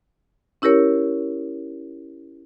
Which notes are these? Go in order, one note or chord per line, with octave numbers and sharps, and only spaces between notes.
C#4 E4 G4 A#4 C#5